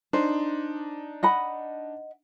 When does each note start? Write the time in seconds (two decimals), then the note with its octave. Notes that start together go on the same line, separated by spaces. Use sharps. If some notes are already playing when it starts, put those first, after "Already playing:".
0.13 D4 D#4 C5
1.23 D#5 F#5 B5